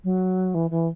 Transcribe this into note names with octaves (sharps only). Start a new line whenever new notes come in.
F#3
E3
E3